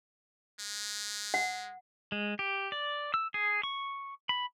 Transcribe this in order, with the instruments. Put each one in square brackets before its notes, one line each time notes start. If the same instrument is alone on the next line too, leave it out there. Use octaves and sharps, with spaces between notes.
[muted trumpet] G#3
[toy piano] F#5
[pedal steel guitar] G#3
G4
D5
E6
G#4
C#6
B5